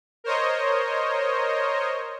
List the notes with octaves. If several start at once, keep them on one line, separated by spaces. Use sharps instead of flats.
A#4 C5 C#5 D#5